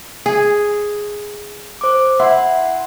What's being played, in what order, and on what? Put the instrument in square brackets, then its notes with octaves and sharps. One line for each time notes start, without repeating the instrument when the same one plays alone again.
[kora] G#4
[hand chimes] C5 D6
[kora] E4 [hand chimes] F#5 C6